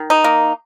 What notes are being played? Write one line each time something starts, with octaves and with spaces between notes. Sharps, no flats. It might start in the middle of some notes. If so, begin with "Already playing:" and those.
Already playing: D#3
D#4
A#3